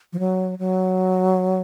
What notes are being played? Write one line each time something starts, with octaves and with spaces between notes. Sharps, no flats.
F3
F#3
F#3